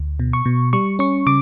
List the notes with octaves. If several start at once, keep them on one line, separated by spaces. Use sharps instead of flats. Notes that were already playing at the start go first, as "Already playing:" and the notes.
Already playing: D2
B2
C#6
B2
G3 C#6
C#4 C#6
C#3 D6